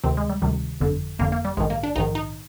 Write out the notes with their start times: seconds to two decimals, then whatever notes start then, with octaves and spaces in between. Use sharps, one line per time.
0.04 D2 C3 D#3 C4
0.17 G#3
0.29 G3
0.42 D2 C3 D#3 G3
0.81 G1 F2 D3
1.19 G1 F2 D3 A#3
1.32 A#3
1.45 G3
1.57 A#1 G#2 D#3 G#3
1.70 A#3
1.83 D4
1.96 A#1 G#2 D#3 D#4
2.15 D#4